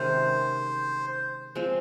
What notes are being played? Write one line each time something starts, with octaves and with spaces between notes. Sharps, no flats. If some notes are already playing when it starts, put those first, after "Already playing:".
Already playing: C3 D#3 G#3 C#4 C5
F3 G#3 C4